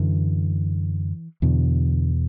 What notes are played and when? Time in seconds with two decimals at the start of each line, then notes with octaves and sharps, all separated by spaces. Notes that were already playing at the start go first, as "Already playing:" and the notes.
Already playing: F#2 D3 E3
1.42 E2 B2 D3